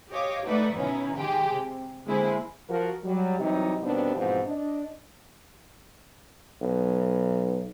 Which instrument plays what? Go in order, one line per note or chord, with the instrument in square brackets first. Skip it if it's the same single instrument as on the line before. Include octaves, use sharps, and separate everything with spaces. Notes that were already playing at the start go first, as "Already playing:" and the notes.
[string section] G4 C#5 D#5 F5 D6
A3 D#4 B4 D5 E5 F#5
B2 D#3 B3 C#4 D#4 E4
D#3 G#3 G4 G#4 G5
C3
D3 G#3 A#3 C4 E4 G#4
[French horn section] F3 F#4 A#4
F#3 G3
C3 E3 F#3 G3 D#4
D#2 B2 G3 B3 C4 D4
G#2 B2 E3 F3 C4
D4 D#5
[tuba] B1